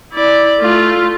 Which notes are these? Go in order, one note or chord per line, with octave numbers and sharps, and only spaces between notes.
E4 D5
A3 F4